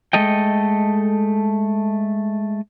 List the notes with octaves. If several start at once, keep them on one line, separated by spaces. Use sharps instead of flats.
G#3 A3 A4 D#5 G5